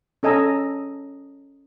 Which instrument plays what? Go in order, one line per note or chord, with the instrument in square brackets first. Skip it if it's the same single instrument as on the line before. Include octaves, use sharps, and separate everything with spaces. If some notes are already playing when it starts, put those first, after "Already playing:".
[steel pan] C#4 A4 D#5 G#5 A#5 E6